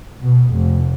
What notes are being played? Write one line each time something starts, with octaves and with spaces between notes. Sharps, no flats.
B2
F1